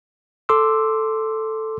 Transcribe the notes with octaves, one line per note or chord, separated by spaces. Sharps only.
A4 C6 D6 E6